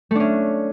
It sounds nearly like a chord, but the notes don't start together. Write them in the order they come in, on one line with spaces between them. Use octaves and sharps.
A3 D4 C#4